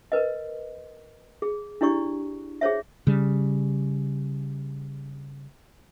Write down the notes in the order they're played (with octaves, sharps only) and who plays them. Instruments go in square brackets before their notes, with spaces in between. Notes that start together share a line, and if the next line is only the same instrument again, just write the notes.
[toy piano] A#4 B4 D#5
G#4
D4 E4 G4 D5 C#6
G#4 C5 C#5 E5
[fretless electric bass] C#3 G3